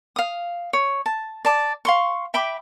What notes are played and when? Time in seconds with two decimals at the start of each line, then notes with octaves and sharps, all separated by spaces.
0.16 F5 D#6
0.73 C#5
1.06 A5
1.45 D5 A5 D6
1.85 F5 C6 C#6
2.34 E5 G5 B5 D6